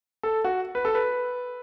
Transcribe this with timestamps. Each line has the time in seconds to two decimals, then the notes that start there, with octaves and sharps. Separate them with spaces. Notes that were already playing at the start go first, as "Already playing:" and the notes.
0.23 A4
0.44 F#4
0.75 B4
0.85 A4
0.95 B4